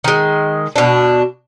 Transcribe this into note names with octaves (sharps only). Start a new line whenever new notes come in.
D#3 G#3
B2 D4